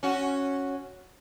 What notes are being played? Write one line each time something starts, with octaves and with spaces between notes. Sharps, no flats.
C#4 F#4